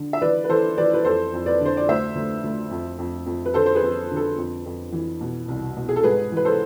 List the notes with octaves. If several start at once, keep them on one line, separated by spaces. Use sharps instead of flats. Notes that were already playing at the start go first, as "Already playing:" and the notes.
Already playing: D3
E5
E3 B4 D5
B4
E3 A4 C5
E3 B4 D5
B4
F2 A4 C5
F2
B4 D5
D3
C5
D5
D2 C5 E5
D2
D2
F2
F2
F2
B4
D3 A4 C5
C5
G#4 B4
F2
D3
A4
F2
F2
E3
B2
C2
B2
G#4
A4
G#2 G#4 B4
E3 B4
A4 C5